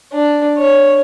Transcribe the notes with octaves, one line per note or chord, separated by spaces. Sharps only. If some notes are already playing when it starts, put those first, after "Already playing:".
D4
C#5